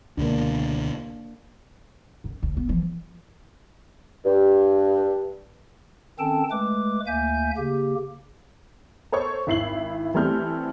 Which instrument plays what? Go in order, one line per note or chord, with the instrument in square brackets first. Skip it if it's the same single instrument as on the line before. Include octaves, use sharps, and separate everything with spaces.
[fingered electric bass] C#2 B2 D3 [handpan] A#3 D4
[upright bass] F#2
D2
B3
E3 F3
[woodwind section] G2
[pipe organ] D#3 C4 C#4 A4 G5 A5
G#3 A3 B4 D6
D2 A#3 E5 G#5 G6
C#3 A#3 G4
[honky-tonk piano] A4 C5 C#5 C#6
G#1 E4 C7 F#7
E3 G3 A3 C4 F6 G6